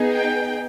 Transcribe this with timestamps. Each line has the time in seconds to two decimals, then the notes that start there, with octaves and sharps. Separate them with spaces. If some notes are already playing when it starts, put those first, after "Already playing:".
Already playing: B3 D#4 G#4
0.13 G5